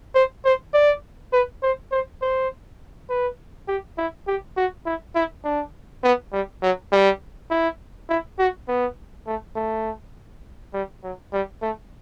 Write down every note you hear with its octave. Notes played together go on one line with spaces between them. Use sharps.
C5
C5
D5
B4
C5
C5
C5
B4
G4
E4
G4
F#4
E4
E4
D4
B3
G3
F#3
G3
E4
E4
F#4
B3
A3
A3
G3
F#3
G3
A3